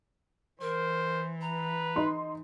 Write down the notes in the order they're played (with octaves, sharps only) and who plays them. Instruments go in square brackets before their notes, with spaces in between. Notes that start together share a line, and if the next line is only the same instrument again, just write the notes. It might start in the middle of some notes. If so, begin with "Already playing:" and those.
[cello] E3 [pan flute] A#4 [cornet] C5
[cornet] B4 [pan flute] A#5
[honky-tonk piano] D#4 C6